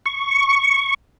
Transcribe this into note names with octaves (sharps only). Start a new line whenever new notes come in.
C#6